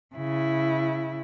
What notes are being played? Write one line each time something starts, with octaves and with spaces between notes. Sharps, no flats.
C#3 E4